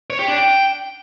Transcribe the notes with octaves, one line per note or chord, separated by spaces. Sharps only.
C#5
G4
D4
G5